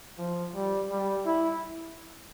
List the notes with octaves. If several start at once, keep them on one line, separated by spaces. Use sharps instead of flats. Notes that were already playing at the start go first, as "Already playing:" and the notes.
F3
G3
G3
E4